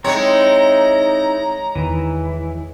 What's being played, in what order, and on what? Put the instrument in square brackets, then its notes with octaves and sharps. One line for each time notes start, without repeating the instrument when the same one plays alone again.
[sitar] G#3 C#5 [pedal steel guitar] C4 D#4 E4 [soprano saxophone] A#5
[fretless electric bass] E2 D#3 [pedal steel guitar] E3